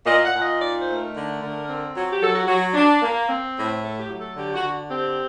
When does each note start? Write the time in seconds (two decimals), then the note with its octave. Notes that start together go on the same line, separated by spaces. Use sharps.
0.06 A#2 D#5
0.25 F#5
0.33 A#2
0.42 D#5
0.60 D#4 D5
0.78 C5
0.87 A3
0.95 A#4
1.14 D3
1.41 D3
1.68 C4
1.94 F#3
2.10 G4
2.21 F#3 A4
2.35 F#4
2.47 F#3 F#4
2.74 D4
3.02 A#3
3.28 C4
3.56 A2
3.82 A3 A4
3.99 G4
4.09 F#3
4.19 A4
4.35 D3 G4
4.54 F#4
4.62 D3
4.89 C4 G4